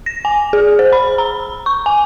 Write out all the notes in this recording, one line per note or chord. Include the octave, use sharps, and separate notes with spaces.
A#6
G#5
G#4
C5
B5
A#5
C#6
G#5